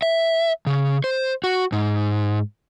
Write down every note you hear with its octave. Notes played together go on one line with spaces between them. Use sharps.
E5
C#3
C5
F#4
G#2